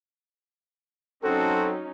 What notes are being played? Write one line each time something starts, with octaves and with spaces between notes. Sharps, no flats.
F#3 C4 C#4 D#4 F#4 A4 C5